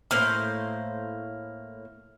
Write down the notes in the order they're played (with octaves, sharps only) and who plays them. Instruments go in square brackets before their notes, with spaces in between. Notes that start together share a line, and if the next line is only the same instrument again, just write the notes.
[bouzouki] A2 A#3 C5 [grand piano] F6